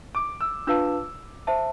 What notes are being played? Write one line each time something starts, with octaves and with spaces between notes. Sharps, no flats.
D6
E6
D4 F4 B4 F5 A5 E6
C5 E5 A5